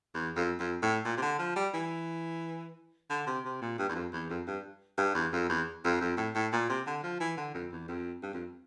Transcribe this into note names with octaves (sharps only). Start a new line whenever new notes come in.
E2
F2
F2
A2
A#2
C3
D3
F3
G3
E3
D3
C3
C3
A#2
G2
E2
F2
E2
F2
G2
G2
E2
F2
E2
F2
F2
A2
A2
A#2
C3
D3
F3
E3
D3
F2
E2
F2
G2
F2